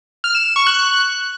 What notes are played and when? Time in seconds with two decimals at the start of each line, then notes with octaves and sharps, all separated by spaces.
0.24 F6
0.35 E7
0.45 E7
0.56 C#6
0.67 F#6